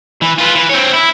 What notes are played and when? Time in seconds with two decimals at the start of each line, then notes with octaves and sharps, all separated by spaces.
0.21 E3
0.38 F4 B4
0.55 E3
0.69 C4 C#5
0.94 E4